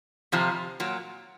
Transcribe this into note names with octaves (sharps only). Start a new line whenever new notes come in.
F2 C3 F3
A#2 F#3